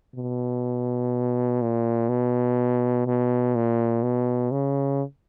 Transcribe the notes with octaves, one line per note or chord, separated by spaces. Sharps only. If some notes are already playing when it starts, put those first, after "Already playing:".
B2
A#2
B2
B2
A#2
B2
C#3